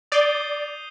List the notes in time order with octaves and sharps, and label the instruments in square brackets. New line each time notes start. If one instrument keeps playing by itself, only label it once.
[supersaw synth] D5 [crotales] D#6 G6 C7 D#7 G7